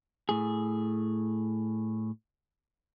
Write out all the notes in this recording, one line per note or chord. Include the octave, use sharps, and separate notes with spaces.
A2 G#4